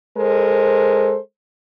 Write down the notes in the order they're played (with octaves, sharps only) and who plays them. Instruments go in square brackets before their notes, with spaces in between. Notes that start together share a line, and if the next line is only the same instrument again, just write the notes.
[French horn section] G#3 A4 A#4 C5